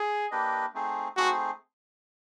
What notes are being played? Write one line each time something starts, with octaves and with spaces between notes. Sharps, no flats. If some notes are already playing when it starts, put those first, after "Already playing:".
Already playing: G#4
A#3 D4 G4 B4 D#5
A3 C4 D#4 G#4 C5
A3 C4 D#4 F#4 G#4 C5